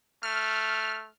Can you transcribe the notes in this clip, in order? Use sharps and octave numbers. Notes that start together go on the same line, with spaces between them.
A3 F6